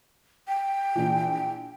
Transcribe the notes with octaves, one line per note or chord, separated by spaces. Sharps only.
G5
A#1 A#2 E3